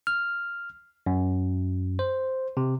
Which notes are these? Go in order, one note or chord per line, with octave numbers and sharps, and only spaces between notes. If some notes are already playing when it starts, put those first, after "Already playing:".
F6
F#2
C5
C3